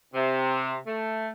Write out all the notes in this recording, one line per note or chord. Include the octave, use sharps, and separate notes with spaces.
C3
A3